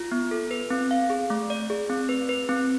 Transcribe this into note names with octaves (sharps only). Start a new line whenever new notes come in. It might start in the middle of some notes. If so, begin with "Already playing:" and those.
Already playing: F4
B3
A4
B4
C4
F5
G#4
A3
D5
G#4
C4
B4
B4
C4